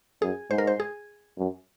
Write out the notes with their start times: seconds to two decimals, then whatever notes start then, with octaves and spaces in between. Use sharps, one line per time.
0.22 F#2 G#4
0.50 G#2 C5
0.58 A#4
0.67 C5
0.80 G#4
1.37 F#2